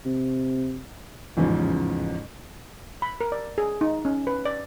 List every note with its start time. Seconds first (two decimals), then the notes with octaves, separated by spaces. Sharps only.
0.06 C3
1.37 A1 E2 G#2 C#3 F3
3.02 B5
3.21 A#4
3.32 D5
3.58 G#4
3.81 D#4
4.05 C#4
4.27 B4
4.45 D5